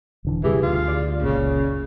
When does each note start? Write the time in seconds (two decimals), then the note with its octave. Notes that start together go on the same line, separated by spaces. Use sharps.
0.25 D#1 B1 D3 E3
0.44 F#2 C3 E3 G3 G4 G#4
0.62 D2 F4
0.88 D5
1.23 F#1 C#2 A#2 C#3